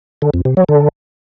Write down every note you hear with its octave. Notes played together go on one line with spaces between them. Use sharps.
D3
F2
C3
F#3
D3